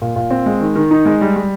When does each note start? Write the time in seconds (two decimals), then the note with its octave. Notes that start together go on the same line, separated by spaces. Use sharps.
0.02 A#2
0.16 A#2
0.31 C4
0.46 G#3
0.61 D#3
0.75 D#3
0.91 D#4
1.05 G#3
1.21 G3
1.36 G3